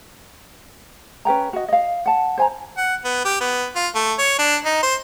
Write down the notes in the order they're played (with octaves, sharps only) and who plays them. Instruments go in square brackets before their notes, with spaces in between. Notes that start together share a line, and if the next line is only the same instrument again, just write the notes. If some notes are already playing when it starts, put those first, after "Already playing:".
[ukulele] C#4 B4 G5 A#5
F#4 D#5
D#5 F5
F#5 A5
C5 G#5 A#5
[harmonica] F#5
B3
G4
B3
F4
A3
C#5
D4
D#4
C5